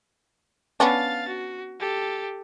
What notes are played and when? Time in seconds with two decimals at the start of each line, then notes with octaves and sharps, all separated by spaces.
0.80 B3 C#4 D4 F5 A6
1.28 F#4
1.80 G4 A4